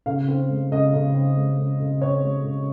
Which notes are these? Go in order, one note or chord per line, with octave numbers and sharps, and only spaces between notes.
C#3 F5
C4
G#3
C#3 D#5
C#3
C4
G#3
C#3
C#3
C4 C#5
G#3
C#3